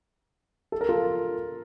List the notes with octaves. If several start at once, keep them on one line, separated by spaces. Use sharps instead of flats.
A4
A#4
F4 A4